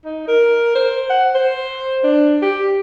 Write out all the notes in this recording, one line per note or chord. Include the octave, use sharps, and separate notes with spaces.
D#4
A#4
C5
F#5
C5
D4
G4